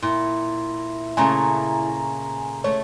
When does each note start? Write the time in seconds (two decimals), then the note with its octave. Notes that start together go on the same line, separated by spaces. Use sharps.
0.02 A#2 E4
1.17 A#2 C#3 A3 G#5 A#5
2.64 A3 C#5